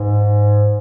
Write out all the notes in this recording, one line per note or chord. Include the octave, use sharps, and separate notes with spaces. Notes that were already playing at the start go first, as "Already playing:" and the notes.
Already playing: G#2